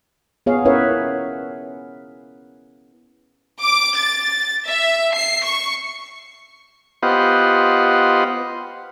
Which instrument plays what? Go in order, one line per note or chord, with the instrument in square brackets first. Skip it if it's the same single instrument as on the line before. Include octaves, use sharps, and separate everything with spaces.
[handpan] B3 G#4 C#5 F5
C#4 E4 A#4 B4 C#5 E5
[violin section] D6
A6
E5
C7
C#6
[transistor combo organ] B3 F4 G4 C5 D#5 F#5